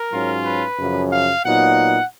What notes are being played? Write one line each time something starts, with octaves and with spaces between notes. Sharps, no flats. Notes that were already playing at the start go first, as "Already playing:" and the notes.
Already playing: A#4
G#2 F#3 C#4 F4
B4
F#2 C#3 F3
F5
A#2 F#3 B3 D#4 F#5